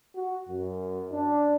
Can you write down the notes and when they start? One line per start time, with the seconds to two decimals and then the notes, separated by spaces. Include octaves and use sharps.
0.15 F#4
0.49 F#2
1.12 D4